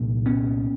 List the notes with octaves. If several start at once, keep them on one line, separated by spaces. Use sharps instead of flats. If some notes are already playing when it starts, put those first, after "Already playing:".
Already playing: C2 A#2
B3 C#4